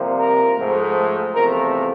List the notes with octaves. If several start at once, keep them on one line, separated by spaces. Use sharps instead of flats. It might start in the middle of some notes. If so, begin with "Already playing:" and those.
Already playing: C2 C3 F3 A#3
A#4
G#2 F3 A3
E2 C3 F3 A3 A#4